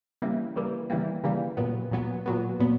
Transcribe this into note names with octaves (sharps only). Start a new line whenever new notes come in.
C#3 E3 G3 A#3
C#3 E3 G3 A#3
C#3 E3 G3 A#3
C#3 E3 G3 A#3
A#2 F#3 B3
A#2 F#3 B3
A#2 F#3 B3
A#2 F#3 B3